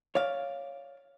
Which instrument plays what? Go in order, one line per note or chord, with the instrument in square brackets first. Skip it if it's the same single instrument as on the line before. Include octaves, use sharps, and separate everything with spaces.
[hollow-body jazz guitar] C#5 D5 F5